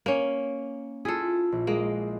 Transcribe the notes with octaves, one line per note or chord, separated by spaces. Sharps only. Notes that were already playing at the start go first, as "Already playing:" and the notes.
A#3 C#4
E4 F4 G#4 A4
A#1
G#3 A#3 G#4 D7